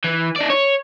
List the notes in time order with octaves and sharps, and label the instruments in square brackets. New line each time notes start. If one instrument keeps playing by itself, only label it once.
[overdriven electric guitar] E3
D#4 D5
C#5